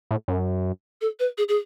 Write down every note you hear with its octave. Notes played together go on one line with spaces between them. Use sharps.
A2
F#2
A4
B4
G#4
G#4